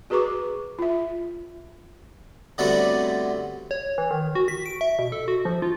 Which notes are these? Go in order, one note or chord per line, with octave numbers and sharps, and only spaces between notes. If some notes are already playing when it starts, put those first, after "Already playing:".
F#4 G#4 B4 A#5 C#6 D6
F4 E5
D3 F#3 G3 A3 B3 C4
C#5
E3
D#3
F#4
B6
D7
E5
B2
A4
F#4
F3
F4